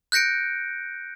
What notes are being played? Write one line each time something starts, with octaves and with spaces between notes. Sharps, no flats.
F#6 G6 A#6 C#7 D7